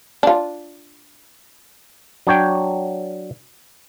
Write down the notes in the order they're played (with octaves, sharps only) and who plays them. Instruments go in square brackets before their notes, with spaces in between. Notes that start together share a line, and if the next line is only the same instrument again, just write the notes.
[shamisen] D4 F4
[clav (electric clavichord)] F#3 D4 C#5 G5